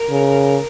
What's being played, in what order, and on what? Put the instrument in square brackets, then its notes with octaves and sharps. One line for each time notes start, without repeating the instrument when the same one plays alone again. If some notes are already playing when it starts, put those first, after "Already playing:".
Already playing: [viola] A#4
[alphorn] C#3